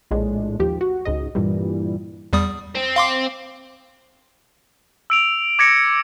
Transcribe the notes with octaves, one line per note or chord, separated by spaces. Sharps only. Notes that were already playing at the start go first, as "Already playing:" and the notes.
A#1 A2 G#3 D4
D#2 F3 G4
F#4
C#2 G#2 D#5
G2 A#2 E3 G3
E2 G3 D#6
C4
F5 C6 D6
E6 D7 F7
D6 G#6 A#6 C#7